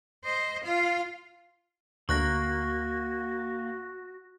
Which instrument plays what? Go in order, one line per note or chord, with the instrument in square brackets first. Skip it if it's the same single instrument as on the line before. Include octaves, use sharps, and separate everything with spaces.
[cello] C5 D#5
F4 F5
[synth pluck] D2 D3 [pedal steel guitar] A#3 [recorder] F#4 [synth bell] C#6 F#6 A#6